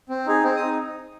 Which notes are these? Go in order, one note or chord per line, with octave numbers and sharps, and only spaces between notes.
C4
D#4 G#4
C4
D#4 D#6